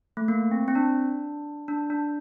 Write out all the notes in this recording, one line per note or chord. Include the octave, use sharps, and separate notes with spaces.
A3
A#3
C4
C4
D4
D4
D4